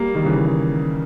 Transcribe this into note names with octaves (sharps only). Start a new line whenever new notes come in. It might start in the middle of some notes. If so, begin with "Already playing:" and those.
Already playing: G3 A#3
D#3 G3
C#3 E3